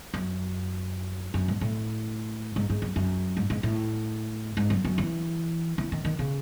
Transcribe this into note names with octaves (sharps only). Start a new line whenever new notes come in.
F#2
F#2
G#2
A2
G#2
G#2
F#2
F#2
G#2
G#2
A2
G#2
F#2
F#2
E3
E3
D#3
D#3
C#3